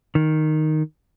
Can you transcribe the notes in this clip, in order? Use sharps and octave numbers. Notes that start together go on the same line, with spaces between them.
D#3